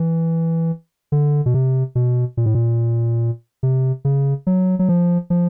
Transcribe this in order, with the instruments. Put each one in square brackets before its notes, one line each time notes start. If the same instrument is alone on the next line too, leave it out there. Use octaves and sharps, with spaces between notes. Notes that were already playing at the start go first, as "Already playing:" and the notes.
Already playing: [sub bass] E3
D3
B2
C3
B2
A#2
A2
A#2
C3
C#3
F#3
F#3
F3
F3